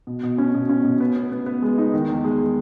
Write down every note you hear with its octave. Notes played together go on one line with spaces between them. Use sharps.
B2
B2
C#4
B2
C#4
B2
B3
B3
B3
B3
G#3
D#4
D#3
E2
G#3